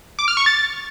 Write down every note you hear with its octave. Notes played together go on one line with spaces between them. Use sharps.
D6
F6
C#6
A6